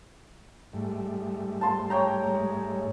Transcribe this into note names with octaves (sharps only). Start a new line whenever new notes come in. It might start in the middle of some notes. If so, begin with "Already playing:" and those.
G#2 G3 A3
A5 C6
C#5 G5 A#5
G#3